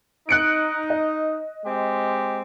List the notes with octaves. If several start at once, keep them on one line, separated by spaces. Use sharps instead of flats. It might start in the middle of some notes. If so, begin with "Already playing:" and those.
D#4 F#6 C#7 D7
D#5
G#3 C4 G4